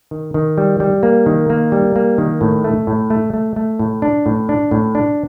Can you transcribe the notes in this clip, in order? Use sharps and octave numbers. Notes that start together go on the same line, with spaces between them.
D#3
D#3
G3
G3
A#3
D#3
A#3
G3
A#3
D#3
A2
A3
A2
A3
A3
A3
A2
D4
A2
D4
A2
D4